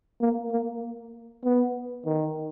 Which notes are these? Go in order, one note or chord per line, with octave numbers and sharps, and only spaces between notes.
A#3
A#3
B3
D#3